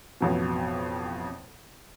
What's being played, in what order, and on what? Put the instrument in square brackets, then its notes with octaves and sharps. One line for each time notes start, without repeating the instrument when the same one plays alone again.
[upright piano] A1 F2 B2